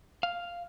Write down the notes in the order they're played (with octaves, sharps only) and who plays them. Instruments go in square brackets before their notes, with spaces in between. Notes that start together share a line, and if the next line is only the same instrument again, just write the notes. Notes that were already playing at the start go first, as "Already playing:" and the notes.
[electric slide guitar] F5